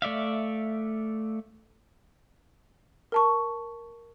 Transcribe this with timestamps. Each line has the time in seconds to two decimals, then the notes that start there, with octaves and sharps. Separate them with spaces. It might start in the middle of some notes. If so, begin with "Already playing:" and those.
0.02 A3 D5 E5 F5
3.12 A#4 A5 C#6